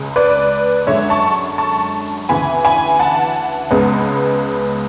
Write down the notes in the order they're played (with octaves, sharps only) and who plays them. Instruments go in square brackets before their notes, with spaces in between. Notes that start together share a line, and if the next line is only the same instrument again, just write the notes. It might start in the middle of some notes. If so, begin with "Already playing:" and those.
Already playing: [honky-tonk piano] C#2 C#3 G#3
B4 D5
F#2 D3 G#3 C#5 E5
A5 C#6
A5 C#6
D2 C#3 E3 G#5 B5
G#5 B5
F#5 A5
C#2 C#3 G#3 B3